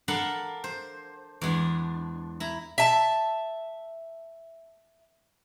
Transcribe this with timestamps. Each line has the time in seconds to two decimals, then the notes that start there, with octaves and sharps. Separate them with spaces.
0.08 D4 A4 A#4 F5 F#5 B5
0.64 C5
1.41 E2 G#3 D4
2.40 E4 A#5
2.78 E5 A5